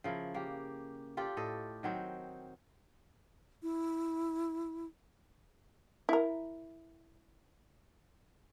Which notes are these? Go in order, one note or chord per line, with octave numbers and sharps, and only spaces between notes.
C#3 F3 E4 A#4
A#3 G4
F4 G4 A4 D5
A2 A4 D#5
D#3 F#3 C4
E4
E4 A#4